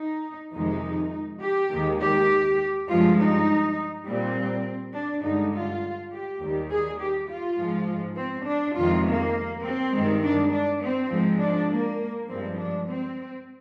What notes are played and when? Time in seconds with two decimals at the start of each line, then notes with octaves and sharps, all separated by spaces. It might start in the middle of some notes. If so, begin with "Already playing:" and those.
Already playing: D#4
0.53 F2 C3 D#3 G#3 D#4
1.41 G4
1.70 D#2 D#3 G#3
2.00 G4
2.88 G2 F3 G#3 F4
3.17 D#4
4.05 A#2 G3 C4
4.94 D4
5.23 G2 D3 G#3 D#4
5.53 F4
6.11 G4
6.41 D#2 D#3 G3
6.70 G#4
6.99 G4
7.29 F4
7.58 G#2 F3 G#3
8.16 C4
8.46 D4
8.76 F2 C3 D#3 G#3 F4
9.05 A#3
9.63 C4
9.93 G2 D#3 G#3
10.23 D4
10.52 D4
10.81 C4
11.10 G#2 F3 G#3
11.40 D4
11.69 A#3
12.28 G2 F3 G#3 C4
12.57 D4
12.87 C4